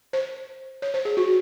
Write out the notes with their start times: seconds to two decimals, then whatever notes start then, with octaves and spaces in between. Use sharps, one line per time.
0.13 C5
0.82 C#5
0.94 C5
1.05 G#4
1.17 F#4